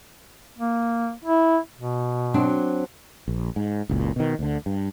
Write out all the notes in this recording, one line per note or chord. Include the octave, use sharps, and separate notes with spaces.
A#3
E4
B2
F#3 C4 D4
A#1
G#2
F#1 C#2 A#2
B2 D#3
D2 D3
G2